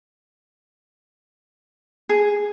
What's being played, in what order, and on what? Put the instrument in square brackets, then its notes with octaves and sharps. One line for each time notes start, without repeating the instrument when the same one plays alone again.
[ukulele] G#4